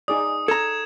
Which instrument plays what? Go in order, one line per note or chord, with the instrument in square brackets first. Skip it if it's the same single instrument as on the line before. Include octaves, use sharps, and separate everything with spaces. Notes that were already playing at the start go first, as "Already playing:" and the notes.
[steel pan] D#4 G#4 D5 [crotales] D#6
[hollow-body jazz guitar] A4 A#5 [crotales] G#6 E7